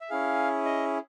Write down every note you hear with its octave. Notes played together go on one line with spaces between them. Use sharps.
E5
C#4 E4 G#4 F5
D#5